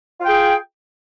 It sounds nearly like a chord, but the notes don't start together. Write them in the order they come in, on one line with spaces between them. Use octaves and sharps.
F4 G5 G#4